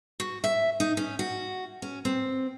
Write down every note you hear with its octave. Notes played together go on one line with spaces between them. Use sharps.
F#4
E5
D#4
C#4
F#4
C#4
C4